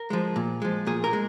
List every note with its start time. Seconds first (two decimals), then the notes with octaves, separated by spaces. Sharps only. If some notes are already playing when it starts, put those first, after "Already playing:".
Already playing: A#4
0.10 F3 G#3
0.36 A#2
0.62 F3 G#3
0.87 A#2 G#4
1.04 A#4
1.13 G#3